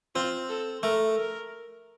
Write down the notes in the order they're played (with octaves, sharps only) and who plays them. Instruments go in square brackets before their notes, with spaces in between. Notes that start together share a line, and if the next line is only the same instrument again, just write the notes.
[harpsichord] C4 [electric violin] F4
[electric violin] A4
[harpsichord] A3 [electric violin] A#4
[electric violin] A#4